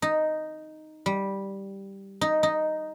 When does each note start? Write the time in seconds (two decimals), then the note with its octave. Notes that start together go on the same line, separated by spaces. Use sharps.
0.02 D#4
1.06 G3
2.21 D#4
2.43 D#4